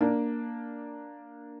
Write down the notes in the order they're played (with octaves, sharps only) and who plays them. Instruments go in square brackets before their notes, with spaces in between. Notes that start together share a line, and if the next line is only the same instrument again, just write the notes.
[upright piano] A#3 D4